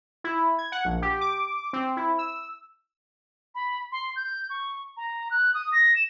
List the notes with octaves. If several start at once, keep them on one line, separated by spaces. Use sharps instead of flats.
E4
G#6
F#5
A#1
G4
D6
C4
E4
E6
B5
C6
G6
C#6
A#5
F#6
D#6
A#6
E7